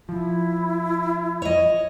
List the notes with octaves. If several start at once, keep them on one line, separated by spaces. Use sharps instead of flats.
F3 E4
C#5 D#5